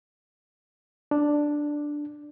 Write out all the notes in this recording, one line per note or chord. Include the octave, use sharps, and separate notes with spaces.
D4